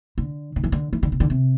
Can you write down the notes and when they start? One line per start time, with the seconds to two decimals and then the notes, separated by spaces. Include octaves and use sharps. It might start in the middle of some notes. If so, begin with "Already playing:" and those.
0.18 D3
0.56 D3
0.64 E3
0.72 D3
0.93 E3
1.03 D3
1.12 C3
1.20 D3
1.30 C3